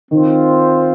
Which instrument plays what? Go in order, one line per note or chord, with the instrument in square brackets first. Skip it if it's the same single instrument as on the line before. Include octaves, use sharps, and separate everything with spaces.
[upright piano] D#3 [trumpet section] C4 F4 C5